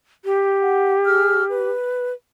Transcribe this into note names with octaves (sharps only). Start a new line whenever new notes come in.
G4
F#5
G#4 E6 F6
B4